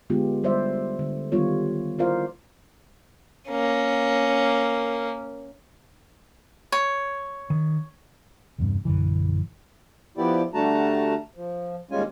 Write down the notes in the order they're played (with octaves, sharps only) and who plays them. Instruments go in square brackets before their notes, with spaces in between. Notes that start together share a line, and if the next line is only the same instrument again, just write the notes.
[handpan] D3 G#3 B3 F4 G4
G3 C5 D5 E5
D3
D#3 G3 B3 F4 C#5
E4 F4 A#4 C5 D5 F5
[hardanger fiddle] A#3 C#4
[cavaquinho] C#5
[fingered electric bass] D#3
[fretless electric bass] B1 E2 G2 C3
A#1 F#2 D3 E3
[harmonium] F3 B3 E4 G4 D5
D3 G3 A3 F#4 A5 A#5
F3
D#2 G3 G#3 C#4 F4 G#5